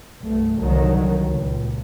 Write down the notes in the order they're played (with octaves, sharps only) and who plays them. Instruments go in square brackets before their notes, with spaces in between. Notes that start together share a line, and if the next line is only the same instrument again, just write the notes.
[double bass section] C2 G2 A3
C2 D3 D#3 F#3
C#2 A#2